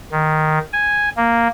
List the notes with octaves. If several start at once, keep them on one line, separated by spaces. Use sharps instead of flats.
D#3
G#5
A#3